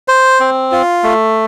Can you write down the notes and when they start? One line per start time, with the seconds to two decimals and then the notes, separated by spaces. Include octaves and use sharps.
0.08 C5
0.40 C4
0.72 F4
1.03 A3